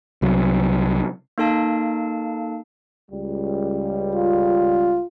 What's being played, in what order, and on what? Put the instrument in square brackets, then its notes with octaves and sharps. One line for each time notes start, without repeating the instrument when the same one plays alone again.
[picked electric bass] C2 F#3
[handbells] A#3 D#4 A4 F5 A5
[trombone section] C#2 G3
[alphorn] F4